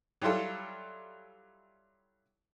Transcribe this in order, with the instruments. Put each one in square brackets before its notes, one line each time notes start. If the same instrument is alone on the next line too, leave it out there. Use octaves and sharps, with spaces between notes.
[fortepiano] F#3 G3 E4 F4 A4